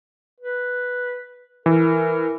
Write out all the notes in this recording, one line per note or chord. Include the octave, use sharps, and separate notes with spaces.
B4
E3 A#4